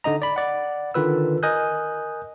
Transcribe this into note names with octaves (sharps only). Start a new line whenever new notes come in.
D3 D#4 D#5 A#5
D5 B5
D5 F#5
D3 D#3 F4 B4 E6
A#4 D#5 G#5 D#6 F#6 G6